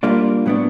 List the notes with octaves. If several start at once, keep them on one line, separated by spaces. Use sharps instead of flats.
G3 A#3 D4 F4
A2 F#3 B3 D4